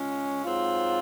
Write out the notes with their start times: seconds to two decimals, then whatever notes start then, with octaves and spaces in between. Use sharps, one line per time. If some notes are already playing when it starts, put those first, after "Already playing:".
Already playing: C#3 G#3 C#4 F4
0.44 G#2 F#3 C4 F4